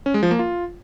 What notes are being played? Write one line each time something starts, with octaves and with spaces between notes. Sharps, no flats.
C#4
G#3
F3
A#3
F4